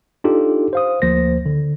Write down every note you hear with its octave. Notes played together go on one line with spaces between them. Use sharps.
D4 D#4 F4 G4 A4
C5 F5 D#6
D2 F3 A#3 C5 A#6
D3